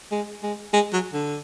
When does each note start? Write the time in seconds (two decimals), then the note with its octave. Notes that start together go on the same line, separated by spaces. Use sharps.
0.11 G#3
0.43 G#3
0.73 G#3
0.93 F#3
1.13 D3